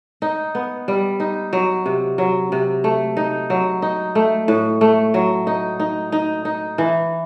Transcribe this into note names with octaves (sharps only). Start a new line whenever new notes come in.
D#4
B3
G3
D#4
F#3
C3
F#3
C3
A3
D#4
F#3
D#4
A3
A2
A3
F#3
D#4
D#4
D#4
D#4
E3